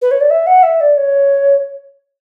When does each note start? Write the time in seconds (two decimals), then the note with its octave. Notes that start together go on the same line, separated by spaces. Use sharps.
0.02 B4
0.11 C#5
0.20 D5
0.30 E5
0.47 F#5
0.63 E5
0.80 D5
0.97 C#5